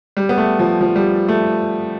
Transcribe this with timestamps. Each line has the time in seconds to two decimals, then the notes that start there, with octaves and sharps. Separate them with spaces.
0.17 G3
0.29 B3
0.38 A3
0.59 F3
0.81 F3
0.96 G3
1.28 A3